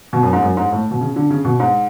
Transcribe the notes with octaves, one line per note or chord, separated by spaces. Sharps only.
B2
F#2
G#2
F#2
G#2
A2
B2
C#3
D3
C#3
B2
G#2